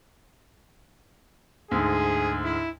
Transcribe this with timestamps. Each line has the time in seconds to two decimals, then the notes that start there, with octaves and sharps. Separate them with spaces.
1.71 D2 G#2 G#4
2.44 E4